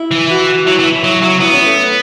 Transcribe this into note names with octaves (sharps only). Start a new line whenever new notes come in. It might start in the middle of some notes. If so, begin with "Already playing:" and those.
Already playing: E4
E3
F#4
F#4
F#3 E4
E3
F#3
F#3
B3 E4
C#4
A3